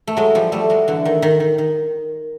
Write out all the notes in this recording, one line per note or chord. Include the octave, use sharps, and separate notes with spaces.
A3
F#3 G#3
F3 G3
G3 A3
F#3 G#3
D3 E3
D#3
D#3
D#3
D#3